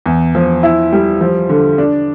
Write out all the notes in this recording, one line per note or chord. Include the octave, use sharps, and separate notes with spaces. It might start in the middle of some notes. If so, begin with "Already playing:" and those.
E2
F3
E4
G3
F3
D3
D4